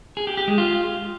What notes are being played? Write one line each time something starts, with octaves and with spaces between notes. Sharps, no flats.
G#4
G4
G4
G#3
F4